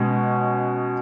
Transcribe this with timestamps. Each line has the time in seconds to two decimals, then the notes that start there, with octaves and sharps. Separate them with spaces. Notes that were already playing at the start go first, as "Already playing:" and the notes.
Already playing: B2 G#3 C#4